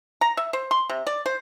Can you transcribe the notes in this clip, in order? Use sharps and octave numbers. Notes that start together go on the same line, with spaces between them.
A#5
E5
C5
C6
C3
D5
C5